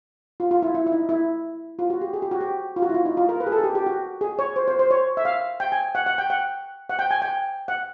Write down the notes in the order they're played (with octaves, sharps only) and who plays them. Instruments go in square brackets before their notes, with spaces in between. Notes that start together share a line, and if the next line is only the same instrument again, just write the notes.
[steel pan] F4
F4
E4
E4
E4
D#4
E4
F4
F#4
G4
G#4
G4
F#4
G4
F4
F#4
E4
F4
D#4
F4
A#4
B4
G#4
A4
G#4
G4
G4
F#4
G#4
C#5
C5
C5
C5
C#5
E5
F5
G5
G#5
F#5
F#5
G5
F#5
F#5
G5
G#5
G5
F#5